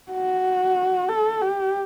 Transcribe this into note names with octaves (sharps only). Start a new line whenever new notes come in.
F#4
A4
G4